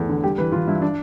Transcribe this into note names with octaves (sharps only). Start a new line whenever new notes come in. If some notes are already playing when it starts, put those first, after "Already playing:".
Already playing: E2 A3
D3
G3 G4
E3 B4
E3 F4
G2 E4
D4